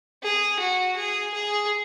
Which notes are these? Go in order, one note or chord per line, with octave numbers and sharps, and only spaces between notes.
G#4
F#4
G#4
G#4